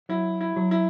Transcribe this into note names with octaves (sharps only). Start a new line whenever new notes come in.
F#3 E4
E4
F#3
E4